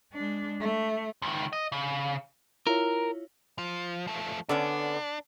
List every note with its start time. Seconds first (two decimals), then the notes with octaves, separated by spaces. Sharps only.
0.13 G#3 D4
0.60 A3
1.22 C#2 D#3
1.53 D#5
1.72 C#3
2.67 E4 F4 A#4 C#5
3.58 F3
4.07 F3 A3
4.49 D3 B3 C#4 D4